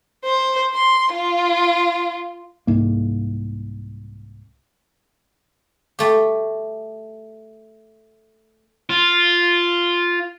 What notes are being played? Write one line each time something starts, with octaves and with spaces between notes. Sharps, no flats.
C5
C6
F4
C2 G#2 A#3
A3 G4
F4